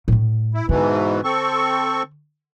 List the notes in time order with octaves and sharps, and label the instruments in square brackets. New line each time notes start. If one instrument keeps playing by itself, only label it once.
[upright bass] A2 A3
[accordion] E4
[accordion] G#2 B2 E3 [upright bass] D3
[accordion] C4 A4 C#6